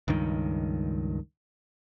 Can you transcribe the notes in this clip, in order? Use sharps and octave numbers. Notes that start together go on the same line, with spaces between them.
C#2 G2 D#3